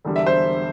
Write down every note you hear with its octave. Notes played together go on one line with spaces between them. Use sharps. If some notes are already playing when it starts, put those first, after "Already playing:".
E1 E2 D3 G3
E5
C5